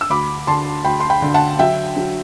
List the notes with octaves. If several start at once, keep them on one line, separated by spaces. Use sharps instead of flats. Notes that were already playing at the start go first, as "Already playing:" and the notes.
E6
D2 B5 D6
D3 A5 C6
D2 G5 B5
C6
G5 B5
D3
F#5 A5
F#3 E5 G5
F#3